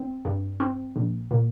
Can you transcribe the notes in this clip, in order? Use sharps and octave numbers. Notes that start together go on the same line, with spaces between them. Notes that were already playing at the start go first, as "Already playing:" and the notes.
Already playing: C4
G2
C4
A#1
A#2